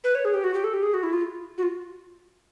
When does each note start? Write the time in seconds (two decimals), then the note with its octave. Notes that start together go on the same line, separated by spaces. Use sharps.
0.04 B4
0.15 C#5
0.25 G#4
0.34 G4
0.44 F#4
0.54 G4
0.64 A4
0.74 G4
0.83 G#4
0.94 F#4
1.03 E4
1.13 F4
1.58 F#4
1.63 F4